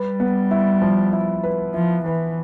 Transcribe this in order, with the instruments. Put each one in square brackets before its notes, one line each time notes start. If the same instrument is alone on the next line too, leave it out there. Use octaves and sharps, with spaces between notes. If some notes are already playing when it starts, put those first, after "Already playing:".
Already playing: [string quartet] G3 [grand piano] B4
[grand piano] B3
E4
F3
E4
B4
[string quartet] F3 [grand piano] E4
[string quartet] E3 [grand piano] B4